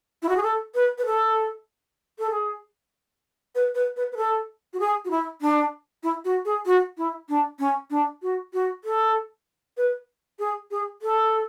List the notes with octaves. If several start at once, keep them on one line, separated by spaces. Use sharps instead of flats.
E4
F#4
G#4
A4
B4
B4
A4
A4
G#4
B4
B4
B4
B4
A4
F#4
G#4
F#4
E4
D4
E4
F#4
G#4
F#4
E4
D4
C#4
D4
F#4
F#4
A4
B4
G#4
G#4
A4